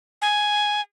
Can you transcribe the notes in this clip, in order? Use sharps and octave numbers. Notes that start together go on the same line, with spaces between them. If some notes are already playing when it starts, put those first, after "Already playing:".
G#5